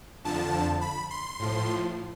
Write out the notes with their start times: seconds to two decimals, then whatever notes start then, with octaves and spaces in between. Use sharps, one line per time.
0.24 F2 D3 F3 A5
0.81 B5
1.11 C6
1.39 A2 F3